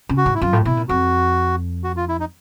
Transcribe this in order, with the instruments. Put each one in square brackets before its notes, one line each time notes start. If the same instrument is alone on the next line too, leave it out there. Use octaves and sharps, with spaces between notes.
[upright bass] C#3
[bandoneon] F#4
[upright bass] G#2
[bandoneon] E4
[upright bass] F#2 [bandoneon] F4
[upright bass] A2
[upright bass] B2 [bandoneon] E4
[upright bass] A#2
[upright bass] F2 [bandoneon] F#4
[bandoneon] F#4
F4
E4
D#4